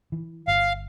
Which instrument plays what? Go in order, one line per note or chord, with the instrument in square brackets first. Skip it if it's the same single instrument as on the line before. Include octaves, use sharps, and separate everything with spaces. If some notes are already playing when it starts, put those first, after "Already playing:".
[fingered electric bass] E3
[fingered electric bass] G1 [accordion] F5